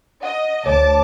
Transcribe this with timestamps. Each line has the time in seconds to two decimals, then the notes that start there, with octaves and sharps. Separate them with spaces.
0.23 D#5 F#5
0.66 D2 C#5 A5 D6